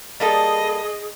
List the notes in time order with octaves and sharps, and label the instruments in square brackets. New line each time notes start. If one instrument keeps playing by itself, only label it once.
[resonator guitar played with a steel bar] G3 A#3 A4 [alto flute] G#4 [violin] D#5